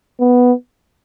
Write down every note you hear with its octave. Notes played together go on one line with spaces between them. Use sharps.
B3